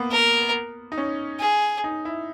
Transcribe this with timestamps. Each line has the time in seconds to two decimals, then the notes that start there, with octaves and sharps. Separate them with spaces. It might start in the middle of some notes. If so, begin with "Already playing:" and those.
Already playing: A#3 B3
0.11 A#4
0.92 D#4
0.98 C#4
1.40 G#4
1.84 D#4
2.05 E4